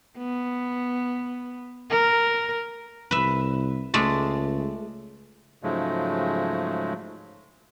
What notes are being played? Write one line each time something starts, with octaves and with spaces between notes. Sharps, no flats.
B3
A#4
C2 B4 E5
C#2 G#3 A3 D5
G#2 C#3 F3 F#3 G#3 A3